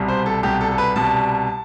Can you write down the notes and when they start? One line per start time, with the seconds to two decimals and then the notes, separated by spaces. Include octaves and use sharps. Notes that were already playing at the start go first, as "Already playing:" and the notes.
Already playing: C2 B2 G3
0.08 C5
0.26 A4
0.43 C2 B2 G3 G4
0.61 A4
0.71 A4
0.78 B4
0.96 C2 B2 G3 A5